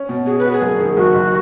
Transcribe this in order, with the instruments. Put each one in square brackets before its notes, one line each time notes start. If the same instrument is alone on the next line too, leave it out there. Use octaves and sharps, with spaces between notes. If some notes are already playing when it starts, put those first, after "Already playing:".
Already playing: [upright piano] C#4
B2
[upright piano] F#4 [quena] G#4
[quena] B4
[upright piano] F#4
[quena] G#4
[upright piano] F#1
D#3
[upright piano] F#1 [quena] F#4
[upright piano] F#1